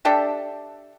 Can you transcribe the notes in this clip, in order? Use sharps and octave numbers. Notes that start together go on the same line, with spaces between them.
D4 G4 A4 E5